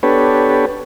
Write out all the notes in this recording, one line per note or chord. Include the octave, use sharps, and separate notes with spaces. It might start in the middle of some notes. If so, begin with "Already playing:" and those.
B3 D4 G4 A4 B4 C#5